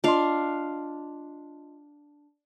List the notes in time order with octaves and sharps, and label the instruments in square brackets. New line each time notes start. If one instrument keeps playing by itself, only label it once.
[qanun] D4 F5 [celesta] F4 D#5 C6